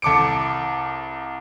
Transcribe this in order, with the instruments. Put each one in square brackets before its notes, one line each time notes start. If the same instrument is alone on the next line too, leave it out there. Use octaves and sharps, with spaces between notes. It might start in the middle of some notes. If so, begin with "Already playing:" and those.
[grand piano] C2 A4 D6 C#7 D7